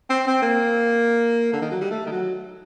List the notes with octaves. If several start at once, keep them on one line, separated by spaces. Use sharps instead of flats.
C4
C4
A#3
D3
D#3
F#3
G3
A3
D#3
F#3